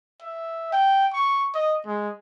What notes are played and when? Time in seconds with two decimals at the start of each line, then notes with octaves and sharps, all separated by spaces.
0.22 E5
0.73 G5
1.13 C#6
1.55 D#5
1.86 G#3